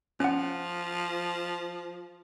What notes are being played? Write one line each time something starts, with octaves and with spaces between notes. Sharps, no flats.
F3 C#4 F#5